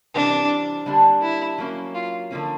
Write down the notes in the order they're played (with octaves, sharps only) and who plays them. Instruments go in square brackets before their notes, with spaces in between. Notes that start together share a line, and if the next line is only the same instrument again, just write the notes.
[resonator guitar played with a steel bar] C3 E3 G3 C4 [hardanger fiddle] D4
[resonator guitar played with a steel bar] D3 G3 A#3 D4
[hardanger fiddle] E4
[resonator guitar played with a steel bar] F#3 A#3 C#4
[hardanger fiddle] F4
[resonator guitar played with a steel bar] D3 F3 A#3 C#4